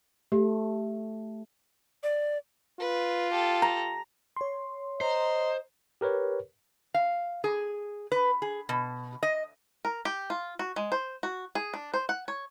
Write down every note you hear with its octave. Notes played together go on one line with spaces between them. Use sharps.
A3 G4
D5
F4 B4
G4 A4
A#5
C#5 C6
C5 D#5 A#5
G4 A#4 B4 C#5
F5
G#4
B4
G#4
B2
D#5
A#4
G4
F4
F#4
G#3
C5
F#4
G#4
D4
C5
F#5
C#5